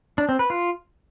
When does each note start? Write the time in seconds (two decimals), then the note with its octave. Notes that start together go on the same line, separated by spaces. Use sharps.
0.18 D4
0.29 C4
0.39 B4
0.50 F4